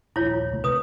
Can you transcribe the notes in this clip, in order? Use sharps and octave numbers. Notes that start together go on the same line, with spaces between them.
D#1 A#1 E4 F4 C#5
C2 A3
C3 B4 D#6